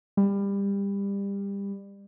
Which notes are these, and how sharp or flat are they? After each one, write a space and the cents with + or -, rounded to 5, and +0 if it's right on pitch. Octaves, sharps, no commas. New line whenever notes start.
G3 +25